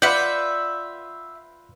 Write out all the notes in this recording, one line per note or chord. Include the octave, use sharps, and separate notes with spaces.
F4 B4 D5 E5 F#5 G6